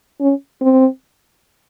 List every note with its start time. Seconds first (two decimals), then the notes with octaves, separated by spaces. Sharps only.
0.20 C#4
0.61 C4